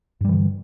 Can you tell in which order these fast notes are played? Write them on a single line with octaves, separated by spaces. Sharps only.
G2 G3 E3 D3